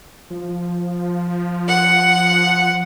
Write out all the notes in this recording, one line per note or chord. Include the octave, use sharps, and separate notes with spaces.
F3
F#5